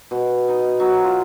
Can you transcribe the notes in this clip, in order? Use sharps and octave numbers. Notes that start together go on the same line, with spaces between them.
B2
D#4
F#3
F4